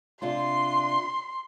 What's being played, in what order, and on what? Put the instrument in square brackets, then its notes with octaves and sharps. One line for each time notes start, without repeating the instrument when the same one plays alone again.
[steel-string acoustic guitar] C3 D4 F4 [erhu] C6